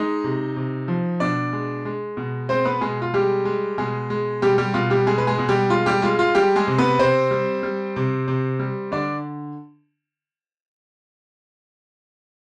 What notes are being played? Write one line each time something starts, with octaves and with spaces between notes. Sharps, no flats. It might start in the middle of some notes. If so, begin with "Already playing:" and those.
Already playing: G#3 D#4 D#5
C3
C3
F3
B2 D4 D5
G#3
G#3
B2
G#3 C4 C5
B3 B4
B2 G#3 G#4
F4
G3 G#3 G4
G#3
B2 G#3 G#4
G#3
B2 G3 G4
G3 G4
B2 F4
G3 G4
B2 G#3 G#4
B4
G#3 G#4
B2
G3 G4
G#3 F4
G3 G4
G#3 F4
F4
G3 G4
G#3 G#4
C3
B3 B4
C3 C4 C5
G3
G3
C3
C3
G3
D3 D4 D5